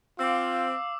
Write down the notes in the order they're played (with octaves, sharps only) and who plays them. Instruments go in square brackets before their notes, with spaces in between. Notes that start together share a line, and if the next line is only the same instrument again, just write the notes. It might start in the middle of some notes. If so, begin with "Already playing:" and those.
[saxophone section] C4 [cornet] F4 [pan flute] F5 [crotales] D6 E6